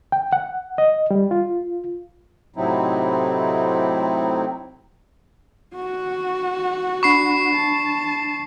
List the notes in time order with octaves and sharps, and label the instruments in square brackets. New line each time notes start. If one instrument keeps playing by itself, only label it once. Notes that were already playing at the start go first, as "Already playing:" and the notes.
[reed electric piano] G5
F#5
D#5
G3
F4
[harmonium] A2 C3 F#3 C4 D#4 E4
[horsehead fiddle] F#4
[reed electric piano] D4 B5 [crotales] C#6 C7
[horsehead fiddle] A5